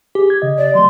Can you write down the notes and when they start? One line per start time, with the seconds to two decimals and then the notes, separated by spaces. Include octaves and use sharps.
0.15 G4 G#4
0.30 G#6
0.42 C#3 D#5
0.58 D5
0.75 F#3 A3 C6